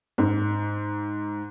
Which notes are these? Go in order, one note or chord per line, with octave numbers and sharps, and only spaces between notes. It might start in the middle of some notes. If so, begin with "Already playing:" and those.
G#2